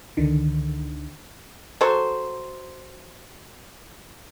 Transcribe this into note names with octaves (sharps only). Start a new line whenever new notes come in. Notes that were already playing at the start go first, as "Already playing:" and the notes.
C#2 D3 D#3
F#3 A4 C5 C#6